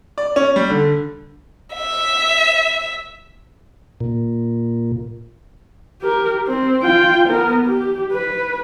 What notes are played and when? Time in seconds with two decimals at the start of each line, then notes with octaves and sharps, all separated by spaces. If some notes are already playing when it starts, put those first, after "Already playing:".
0.18 D5
0.36 C#4
0.56 G3
0.70 D3
1.75 E5
4.01 A#2
6.01 G4 A#4
6.47 C4
6.83 F4 G5
7.30 B3 A#4
7.66 G4
8.13 B4